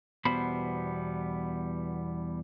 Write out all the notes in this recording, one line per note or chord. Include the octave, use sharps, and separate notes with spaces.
E2 B2 G3 B3 C5 B5